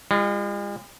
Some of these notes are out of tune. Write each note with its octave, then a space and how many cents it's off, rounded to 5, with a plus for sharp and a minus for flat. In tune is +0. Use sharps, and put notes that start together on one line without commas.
G#3 -45 F4 -20